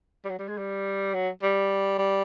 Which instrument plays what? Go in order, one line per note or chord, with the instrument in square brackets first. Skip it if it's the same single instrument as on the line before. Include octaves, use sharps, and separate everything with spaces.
[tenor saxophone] G3
F#3
G3
G#3
G3
F#3
G3
G3